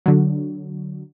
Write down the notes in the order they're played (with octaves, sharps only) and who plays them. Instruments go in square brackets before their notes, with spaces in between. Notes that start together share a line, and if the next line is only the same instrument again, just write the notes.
[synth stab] D3 F#3